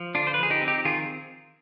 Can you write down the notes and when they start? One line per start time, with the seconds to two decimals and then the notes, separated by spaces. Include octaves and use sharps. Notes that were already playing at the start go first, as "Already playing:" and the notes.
Already playing: F3
0.15 D3 D4 F4
0.27 C5
0.34 B4
0.38 F3 G#4
0.50 D#4 G4
0.62 C4
0.68 D#4 G4
0.85 D#3 F4 G#4